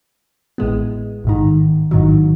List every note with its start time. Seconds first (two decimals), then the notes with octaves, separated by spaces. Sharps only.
0.58 A1 A2 G#3 B3
1.24 A1 G#2 D#3
1.91 A1 G#2 D#3 F#3